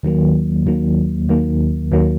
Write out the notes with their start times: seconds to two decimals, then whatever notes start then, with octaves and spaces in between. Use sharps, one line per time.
0.03 D#2 D#3 F#3 A#3
0.66 D#2 D#3 F#3 A#3
1.29 D#2 D#3 F#3 A#3
1.92 D#2 D#3 F#3 A#3